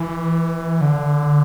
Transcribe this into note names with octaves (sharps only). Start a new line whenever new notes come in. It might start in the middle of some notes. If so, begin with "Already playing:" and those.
Already playing: E3
D3